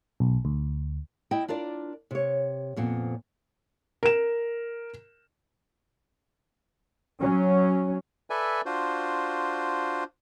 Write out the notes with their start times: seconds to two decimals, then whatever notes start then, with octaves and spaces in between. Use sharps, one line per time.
0.20 B1
0.45 D2
1.31 E4 D#5 G5
1.48 D4 F4 A#4 D5
2.11 C3 C#5
2.76 F2 A#2 B3 C4
4.03 A#4 E7
7.20 F#3 C#4
8.30 A4 B4 D5 E5 G#5
8.66 D4 F4 F#4 C5